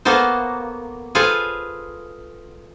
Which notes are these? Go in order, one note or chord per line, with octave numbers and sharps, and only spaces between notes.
A#3 B3 F#4 A4 C5
F4 G#4 A4 B4 C5 F5